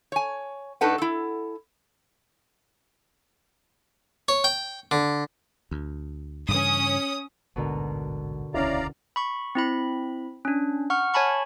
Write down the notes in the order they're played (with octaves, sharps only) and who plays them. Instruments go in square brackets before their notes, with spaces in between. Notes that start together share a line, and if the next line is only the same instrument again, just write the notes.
[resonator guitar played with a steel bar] C#5 G#5
A2 D4 D#4 A4 B4 F#5
E4 A4
[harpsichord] C#5
G5
D3
[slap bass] D2
[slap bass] G2 C#3 E3 [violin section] C#4 D#6
[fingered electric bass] A1 D2 G#2 [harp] B2 D3 A#4
[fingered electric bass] D#1 C#2 [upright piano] C#4 E4 [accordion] D5 F5 A#5
[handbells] B5 C#6
C4 E4 B5
C#4 D4
F#5 C#6 F6
C#5 G#5 A5 B5 C#6